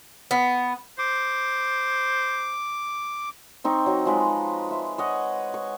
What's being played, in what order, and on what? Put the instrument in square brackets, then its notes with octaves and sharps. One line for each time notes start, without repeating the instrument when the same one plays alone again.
[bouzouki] B3
[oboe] C5 [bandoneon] D6
[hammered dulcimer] C4 D#4 C#6
F#3
F3 G#3 B4
E5
C#5 D#5 F#5
C#6